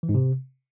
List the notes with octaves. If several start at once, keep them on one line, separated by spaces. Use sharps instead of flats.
E3
G#2
C3